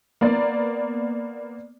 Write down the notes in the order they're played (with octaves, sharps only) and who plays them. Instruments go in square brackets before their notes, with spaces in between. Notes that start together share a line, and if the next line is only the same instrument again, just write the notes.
[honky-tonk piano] A#3 B3 D5